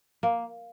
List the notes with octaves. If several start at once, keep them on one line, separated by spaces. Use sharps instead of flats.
A#3